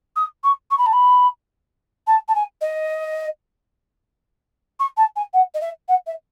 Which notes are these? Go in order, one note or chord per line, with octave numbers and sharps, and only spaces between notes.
D#6
C#6
C#6
B5
A5
B5
A5
A5
G#5
D#5
C#6
A5
G#5
F#5
D#5
E5
F#5
E5